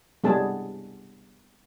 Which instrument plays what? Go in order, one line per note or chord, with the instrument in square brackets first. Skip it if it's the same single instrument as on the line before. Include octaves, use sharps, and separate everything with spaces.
[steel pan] G3 B3 G#4 A5